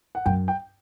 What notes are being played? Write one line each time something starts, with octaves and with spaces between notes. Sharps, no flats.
F#5
F#2 G5
G5